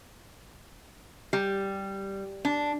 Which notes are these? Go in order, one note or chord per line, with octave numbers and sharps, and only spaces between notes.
G3
D4